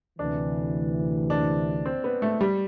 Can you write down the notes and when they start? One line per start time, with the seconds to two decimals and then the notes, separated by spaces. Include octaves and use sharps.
0.19 D2 C3 E3 D4
1.30 D4
1.86 C4
2.04 B3
2.22 A3
2.41 G3